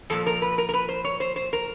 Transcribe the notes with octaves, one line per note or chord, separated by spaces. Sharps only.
A#2 F3 A4
A#4
B4
A#4
A#4
B4
C5
C#5
C5
C5
A#4